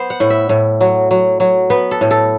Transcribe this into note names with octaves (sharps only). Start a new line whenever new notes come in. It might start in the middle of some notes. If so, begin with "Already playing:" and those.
Already playing: B3 C5
F#5
A2
E5
A2
F#3
F#3
F#3
B3 B4
A4
A2
A4